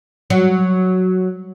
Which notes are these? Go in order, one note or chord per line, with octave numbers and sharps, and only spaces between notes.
F#3